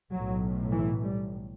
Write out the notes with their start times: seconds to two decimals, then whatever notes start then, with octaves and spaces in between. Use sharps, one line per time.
0.11 B1 A2 F#3
0.72 E3
1.03 G3